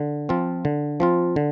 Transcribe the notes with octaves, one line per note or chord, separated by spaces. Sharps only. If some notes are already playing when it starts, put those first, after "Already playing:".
Already playing: D3
F3 C4 F4
D3
F3 C4 F4
D3